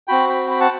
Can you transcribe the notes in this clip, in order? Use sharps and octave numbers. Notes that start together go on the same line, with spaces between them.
C4 F#4 G5 B5
G5 B5
G5 B5
F#5 A5